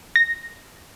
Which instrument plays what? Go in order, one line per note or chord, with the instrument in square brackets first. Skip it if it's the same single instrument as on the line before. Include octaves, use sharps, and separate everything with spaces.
[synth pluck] A#6